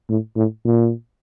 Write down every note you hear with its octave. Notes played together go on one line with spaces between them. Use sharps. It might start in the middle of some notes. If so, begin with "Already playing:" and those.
A2
A2
A#2